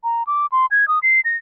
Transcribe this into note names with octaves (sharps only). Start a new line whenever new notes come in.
A#5
D6
C6
G#6
D#6
C7
A#6